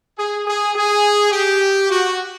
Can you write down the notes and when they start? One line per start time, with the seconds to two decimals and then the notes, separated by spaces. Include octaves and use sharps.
0.17 G#4
0.47 G#4
0.75 G#4
1.32 G4
1.90 F#4